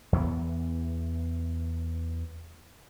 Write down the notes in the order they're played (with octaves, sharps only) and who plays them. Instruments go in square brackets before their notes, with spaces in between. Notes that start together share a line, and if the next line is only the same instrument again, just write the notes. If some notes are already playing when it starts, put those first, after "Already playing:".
[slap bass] E2 E3 A3 B3